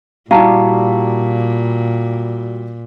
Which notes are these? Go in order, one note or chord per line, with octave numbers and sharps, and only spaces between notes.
A#2 G3 E4 F#4 G4 F5 A5 A#5